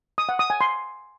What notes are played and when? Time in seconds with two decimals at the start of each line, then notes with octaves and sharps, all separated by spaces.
0.18 D#6
0.29 F#5
0.39 D#6
0.50 G#5
0.61 C6